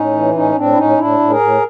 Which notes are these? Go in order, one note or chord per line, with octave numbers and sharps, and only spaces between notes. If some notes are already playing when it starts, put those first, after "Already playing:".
Already playing: A2 C#4 D#4
E3
A2 C#4 D#4
A2 C4 D4
E4
A2 C#4 D#4
A2 D4 E4
A2
G#4 A#4
A2